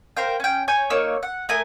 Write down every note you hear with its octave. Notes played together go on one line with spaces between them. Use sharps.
A#4 C5 F5 G5
C#4 G5
C#5 G#5 G6
A#3 D#4 C#5 E6
F#5
A3 A#4 G#5 D#6